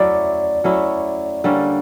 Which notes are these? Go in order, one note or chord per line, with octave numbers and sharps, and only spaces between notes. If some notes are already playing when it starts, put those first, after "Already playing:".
Already playing: F#3 A3 C#4 E4 D5
F#3 A3 C#4 E4
D3 G3 A#3 C#4